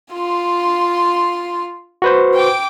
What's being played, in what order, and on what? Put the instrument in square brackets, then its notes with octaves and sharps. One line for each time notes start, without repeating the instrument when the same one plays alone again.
[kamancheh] F4 C6
[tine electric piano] F#4 B4 C5
[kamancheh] G5 D6